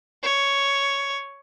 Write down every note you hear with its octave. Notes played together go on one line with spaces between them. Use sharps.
C#5